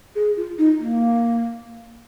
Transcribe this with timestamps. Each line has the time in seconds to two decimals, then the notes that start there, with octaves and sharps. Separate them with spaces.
0.16 G#4
0.37 F4
0.58 D#4
0.79 A#3